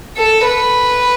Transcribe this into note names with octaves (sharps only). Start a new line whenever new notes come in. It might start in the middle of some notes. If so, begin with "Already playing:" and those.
A4
B4